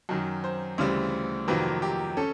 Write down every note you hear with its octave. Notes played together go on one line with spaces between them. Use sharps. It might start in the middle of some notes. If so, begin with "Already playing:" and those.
F#2 D#3 F#3
C5
D2 C#3 E3 G3 C4
F2 C3 D#3 F#3 A#3 B4
G4
C#4 A4